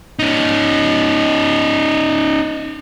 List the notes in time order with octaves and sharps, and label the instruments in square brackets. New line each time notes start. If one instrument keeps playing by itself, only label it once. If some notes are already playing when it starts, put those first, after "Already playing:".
[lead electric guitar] C#4 D#4